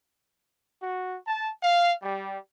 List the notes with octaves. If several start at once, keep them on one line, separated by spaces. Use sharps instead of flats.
F#4
A5
F5
G3